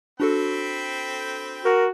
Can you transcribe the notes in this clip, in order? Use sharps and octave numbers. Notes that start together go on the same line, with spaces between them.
C4 D4 F#4 A4 G5 B5
F#4 A#4